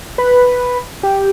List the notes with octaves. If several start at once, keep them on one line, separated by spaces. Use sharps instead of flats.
B4
G4